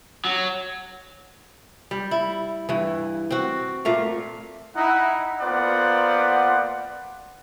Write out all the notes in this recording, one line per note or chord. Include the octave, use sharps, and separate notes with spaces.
F#3
G3
E4
G2 E3
C4 F#4
A#2 A3 F5
D#4 E4 F#5
A#3 B3 F4 C5 D5 F#5